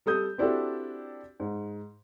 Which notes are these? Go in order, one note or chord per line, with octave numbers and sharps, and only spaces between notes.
G3 A4 D#6 G6
C4 D4 E4 F#4 G4 A4
G#2